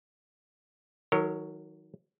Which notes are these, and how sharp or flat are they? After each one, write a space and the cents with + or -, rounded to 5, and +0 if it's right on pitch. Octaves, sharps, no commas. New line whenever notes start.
D#3 +30 F#3 +0 A#4 -30